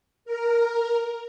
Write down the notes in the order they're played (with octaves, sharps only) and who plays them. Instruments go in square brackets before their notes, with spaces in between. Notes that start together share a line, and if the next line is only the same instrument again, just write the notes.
[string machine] A#4